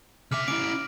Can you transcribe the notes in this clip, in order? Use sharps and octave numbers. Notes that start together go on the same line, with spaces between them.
C#3 E5 D6 F6
C#4 E4 D6 D7